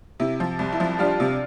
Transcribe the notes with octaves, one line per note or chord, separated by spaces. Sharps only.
C3 E4
F3
C2
E4
F3
G3 D4 F4
C3